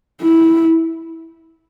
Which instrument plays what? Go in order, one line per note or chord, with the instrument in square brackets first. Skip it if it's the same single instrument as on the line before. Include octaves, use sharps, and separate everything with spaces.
[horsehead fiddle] E4